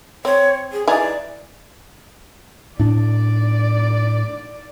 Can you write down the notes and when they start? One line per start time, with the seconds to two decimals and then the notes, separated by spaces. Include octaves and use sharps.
0.25 C4 C#5
0.73 G#4
0.88 E3 D#4 G#4 D5
2.79 A2 D4 D5